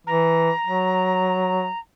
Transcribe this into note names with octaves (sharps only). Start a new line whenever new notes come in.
E3 A#5
F#3